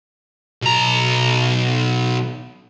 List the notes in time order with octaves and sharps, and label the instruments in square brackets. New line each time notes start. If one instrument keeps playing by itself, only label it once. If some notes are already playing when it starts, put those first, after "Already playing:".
[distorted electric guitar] B1 A#5